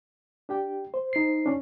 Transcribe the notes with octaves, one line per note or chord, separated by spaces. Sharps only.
D4 G4 G5
C5
D#4 C7
C#4 D4